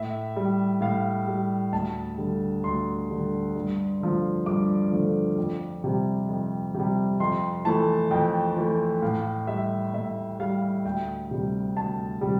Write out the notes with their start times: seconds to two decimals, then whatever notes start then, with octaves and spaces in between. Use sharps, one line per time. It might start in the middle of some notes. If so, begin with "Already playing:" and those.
Already playing: A2 E5
0.36 G3
0.81 A2 F5
1.27 G3
1.72 D2 A5
2.18 D3 G3
2.64 D2 C6
3.09 D3 G3
3.55 G2
4.00 D3 F3 A3
4.46 G2 D6
4.92 D3 F3 A3
5.38 F2
5.84 C3 G3
6.29 F2
6.74 C3
6.79 G3
7.20 F2 C6
7.65 E3 A3 A5
8.11 F2 G5
8.57 E3 A3
9.02 A2 F5
9.47 G3 E5
9.94 A2 E5
10.40 G3 F5
10.84 D2 G5
11.31 C3 G3
11.77 D2 A5
12.21 C3 G3